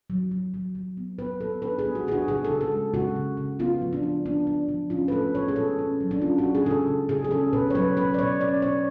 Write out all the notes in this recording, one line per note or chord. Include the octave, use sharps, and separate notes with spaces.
F#3
F#3
F#3
F#3
B3
B3 B4
B3 A4
D4 B4
G#4
B3
F#4
D4 F#4 G#4
C#3 G#4
A4
C#3
A4
G#3
C#3 F#4
C#3
C#3
B3 F4
F3
D4
D4
B3 D4
D4
F3
C#4 F4
B4
A3 A4
C#4 C#5
G#4
B2 A4
C#4
F#3
D4
C#4 F4
F#4
C#4
G#4
C#3 A4
G#4
C#3
C#3 G#4
G#4
C#4 A4
B2 B4
C#5
F#3 B4
C#4 B4
D5
B2 C#5
C#4 D5
B2 C#5